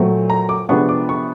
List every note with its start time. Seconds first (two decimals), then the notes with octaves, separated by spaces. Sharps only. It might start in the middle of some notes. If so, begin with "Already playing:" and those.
Already playing: A#2 F#3 A3 C4
0.30 A#5
0.49 D6
0.69 C3 F3 G#3 B3 D4 C#6
0.89 D6
1.09 C#6